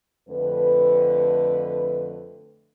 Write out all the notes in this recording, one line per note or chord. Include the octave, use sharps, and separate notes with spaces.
F2 D3 A3 B4